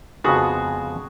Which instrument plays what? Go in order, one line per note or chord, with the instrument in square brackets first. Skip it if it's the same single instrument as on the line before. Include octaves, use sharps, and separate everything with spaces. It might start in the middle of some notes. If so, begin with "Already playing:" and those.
[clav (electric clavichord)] F2 C#3 F3 G#3 B3 [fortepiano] F#4 G#4